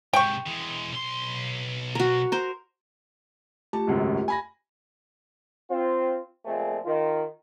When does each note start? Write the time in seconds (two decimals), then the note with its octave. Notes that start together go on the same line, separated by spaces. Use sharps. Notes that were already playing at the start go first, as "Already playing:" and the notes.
0.13 G#2 C3 G5 C#6
0.46 E3 G#3
0.92 B1 C6
1.95 F#4 A#4
2.32 A#4 C5
3.73 A3 F4 G4 A5
3.87 G#1 C#2 F#2
4.28 G#5 B5 A#6
5.71 C4 F4
6.45 A#2 F3 G#3 A3 C4 G#4
6.85 D#3 F4